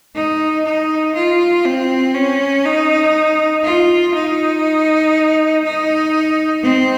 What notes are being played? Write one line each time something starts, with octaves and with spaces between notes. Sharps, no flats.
D#4
D#4
F4
C4
C#4
D#4
F4
D#4
D#4
C4